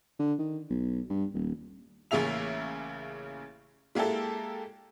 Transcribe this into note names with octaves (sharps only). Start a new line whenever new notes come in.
D3
D#3
B1
G2
D#1
A1 C#3 A#3 G#4 E5 F7
G#3 A#3 E4 G4 A4